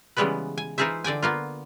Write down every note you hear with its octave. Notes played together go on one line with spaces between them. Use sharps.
C#3 E3 G3 G#3 B3 B4
G#5
E3 D#4 F4 G#4 C5 E5
D3 D5 G5 G#5
A#3 B3 F4